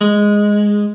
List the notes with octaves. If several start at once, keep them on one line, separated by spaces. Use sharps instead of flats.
G#3